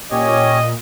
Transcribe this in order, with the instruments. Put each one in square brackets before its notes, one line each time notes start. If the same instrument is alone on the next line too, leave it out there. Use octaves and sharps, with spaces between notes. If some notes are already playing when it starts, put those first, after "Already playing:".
[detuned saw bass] A#2 [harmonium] C#4 G4 C#5 [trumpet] D#5